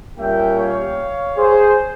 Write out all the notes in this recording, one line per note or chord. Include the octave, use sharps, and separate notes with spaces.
A#2 G3 A#3 C#4 E5 G5
C#5 F5
G#4 C5